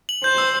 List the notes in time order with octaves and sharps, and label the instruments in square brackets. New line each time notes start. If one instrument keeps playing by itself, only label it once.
[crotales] F#7
[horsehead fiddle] C5 [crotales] G6
[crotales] E6